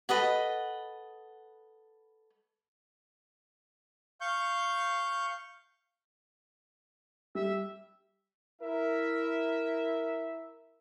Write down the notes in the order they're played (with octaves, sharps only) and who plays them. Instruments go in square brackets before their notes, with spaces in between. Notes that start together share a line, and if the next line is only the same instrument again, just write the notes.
[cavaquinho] A4 B4 D#5 F#5
[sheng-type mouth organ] F5 C#6 G6
[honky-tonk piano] G3 [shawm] E5
[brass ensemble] E4 A#4 E5